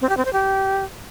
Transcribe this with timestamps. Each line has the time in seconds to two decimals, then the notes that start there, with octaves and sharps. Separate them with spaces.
0.01 C4
0.09 G4
0.17 C4
0.25 C5
0.33 G4